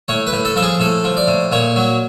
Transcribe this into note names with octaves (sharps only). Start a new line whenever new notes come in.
A2 C#5
B4
A2
A4
F3 A4
G#4
A2 A4
F3
D5
A2
A#2 C#5
F#3